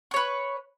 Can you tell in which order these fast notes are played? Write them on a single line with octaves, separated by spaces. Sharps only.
C#6 C#5 B4